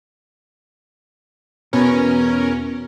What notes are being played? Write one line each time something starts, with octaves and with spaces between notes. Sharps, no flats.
E2 B2 B3 C#4 A#4